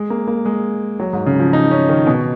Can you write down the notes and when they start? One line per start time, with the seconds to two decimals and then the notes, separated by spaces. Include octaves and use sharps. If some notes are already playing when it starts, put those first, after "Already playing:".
Already playing: G#3
0.10 A#3
0.27 A#3
0.45 G#3
1.00 F#3
1.13 G#2
1.26 C#3
1.39 F3
1.53 D#4
1.71 C#4
1.89 D#3
2.07 B2